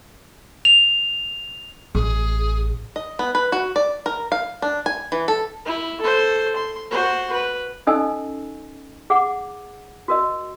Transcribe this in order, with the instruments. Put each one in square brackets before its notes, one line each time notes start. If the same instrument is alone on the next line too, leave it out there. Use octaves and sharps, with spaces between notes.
[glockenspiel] F7
[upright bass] A1 [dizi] G#4
[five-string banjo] D#5
B3
B4
F#4
D5
A#4
F5
D4
G#5
E3
A4
[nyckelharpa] E4
A4 C5
C6
F#4 C5
B4
[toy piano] C#4 D#4 A4 D#5 G#5 E6
G#4 F#5 D6
F#4 A#4 D#5